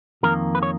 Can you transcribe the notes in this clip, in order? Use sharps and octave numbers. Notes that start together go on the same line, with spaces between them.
F2 D#3 A#3 A#4
B4
C#5